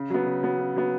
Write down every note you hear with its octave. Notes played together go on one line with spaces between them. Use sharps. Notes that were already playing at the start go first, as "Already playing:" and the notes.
Already playing: C#3
F#3 B3
C#3
F#3 B3
C#3
F#3 B3